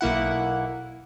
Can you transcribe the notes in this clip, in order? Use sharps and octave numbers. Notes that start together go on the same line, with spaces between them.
B1 A#3 E4 F#5